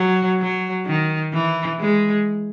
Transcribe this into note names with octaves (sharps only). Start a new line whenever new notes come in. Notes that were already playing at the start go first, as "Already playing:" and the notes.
Already playing: F#3
F#3
D#3
E3
G#3